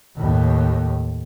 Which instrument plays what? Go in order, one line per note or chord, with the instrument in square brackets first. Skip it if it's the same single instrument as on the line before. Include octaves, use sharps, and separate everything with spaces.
[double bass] D#2 A2